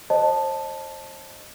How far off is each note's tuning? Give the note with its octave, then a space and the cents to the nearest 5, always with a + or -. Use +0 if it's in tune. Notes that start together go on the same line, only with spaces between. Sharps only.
C5 +35 D#5 -20 A5 +0